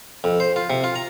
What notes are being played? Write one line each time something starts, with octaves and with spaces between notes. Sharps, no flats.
F2
C5
F4
C3
F4
A#5